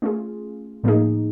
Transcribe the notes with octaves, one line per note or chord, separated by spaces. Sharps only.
A3 C#4 F4 G#4
A2 F3 A#3 D#4 G#4